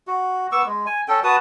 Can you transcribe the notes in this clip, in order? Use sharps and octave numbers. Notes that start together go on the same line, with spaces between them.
F#4
B3 C#6 D6 E6
G#3
G#5
C#4 A4 G5
F#4 B4 A5 D#6